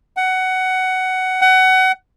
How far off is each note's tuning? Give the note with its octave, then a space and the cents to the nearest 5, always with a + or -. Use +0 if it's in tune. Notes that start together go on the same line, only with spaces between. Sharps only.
F#5 +15
F#5 +25